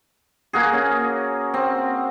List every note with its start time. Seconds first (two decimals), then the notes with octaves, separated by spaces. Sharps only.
0.53 A#3 F#4 G#4
0.73 C#4
1.54 C4